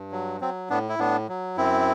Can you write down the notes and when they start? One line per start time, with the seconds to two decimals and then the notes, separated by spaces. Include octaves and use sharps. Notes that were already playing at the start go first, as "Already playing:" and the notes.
Already playing: G2
0.12 F#3
0.41 F#3 C4
0.70 A2 B3 D4
0.89 E4
0.99 A2 B3 D4
1.29 F#3
1.57 F#2 C4 E4